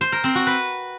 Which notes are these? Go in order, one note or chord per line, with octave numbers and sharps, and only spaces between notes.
C5
A#4
C4
F#4
B4